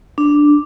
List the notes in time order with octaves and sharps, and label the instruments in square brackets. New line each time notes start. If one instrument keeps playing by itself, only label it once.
[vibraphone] D4